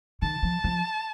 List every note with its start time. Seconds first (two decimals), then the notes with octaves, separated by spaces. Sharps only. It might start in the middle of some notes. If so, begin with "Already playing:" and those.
0.22 D#3 A5
0.43 F3
0.64 F3